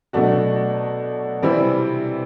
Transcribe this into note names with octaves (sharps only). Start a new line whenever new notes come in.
B2 F#3 A3 D4 F#4
C3 E3 G3 C4 E4